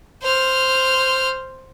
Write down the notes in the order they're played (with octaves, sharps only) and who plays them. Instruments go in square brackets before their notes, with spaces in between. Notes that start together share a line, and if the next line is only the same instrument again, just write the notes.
[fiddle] C5 F6